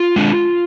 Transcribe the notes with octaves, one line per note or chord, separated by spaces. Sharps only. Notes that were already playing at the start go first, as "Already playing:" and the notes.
Already playing: F4
G#3 D4